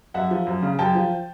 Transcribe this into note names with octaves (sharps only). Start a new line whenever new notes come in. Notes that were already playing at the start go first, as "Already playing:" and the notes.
F#2 E5 F#5
F3
F#2
C#3
F#2 G5 A5
F3